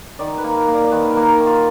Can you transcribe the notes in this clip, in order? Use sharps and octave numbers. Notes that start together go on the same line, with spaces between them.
D#3 D5
B4
A#3
A#4
A#3
D5
D5
D#3 B4
A#4
A#3
A#4
D#3
F4